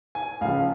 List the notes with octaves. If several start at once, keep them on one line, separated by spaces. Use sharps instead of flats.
G#5
C#2 C#3 F3 C#4 F5